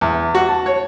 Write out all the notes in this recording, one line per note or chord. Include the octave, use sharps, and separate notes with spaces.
E2
F#4
A5
C#5